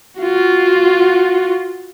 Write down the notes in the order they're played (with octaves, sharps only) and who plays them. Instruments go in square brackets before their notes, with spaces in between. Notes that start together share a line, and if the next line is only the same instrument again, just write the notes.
[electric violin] F4 F#4